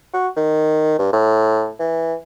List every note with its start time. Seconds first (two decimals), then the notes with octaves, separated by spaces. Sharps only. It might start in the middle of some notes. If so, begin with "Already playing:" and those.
0.14 F#4
0.36 D#3
0.99 G2
1.13 A2
1.79 E3